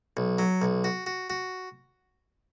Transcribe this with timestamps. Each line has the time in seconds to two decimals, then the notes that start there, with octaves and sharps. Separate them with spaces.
0.17 B1
0.38 F#3
0.62 B1
0.84 F#4
1.06 F#4
1.30 F#4